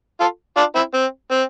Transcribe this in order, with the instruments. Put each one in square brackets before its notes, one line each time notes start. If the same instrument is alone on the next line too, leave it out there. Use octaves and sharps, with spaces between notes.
[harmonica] F4 A4
D4 F4
C4 E4
C4
C4